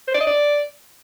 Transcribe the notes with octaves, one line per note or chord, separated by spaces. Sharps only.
C5
D5
D#5
D5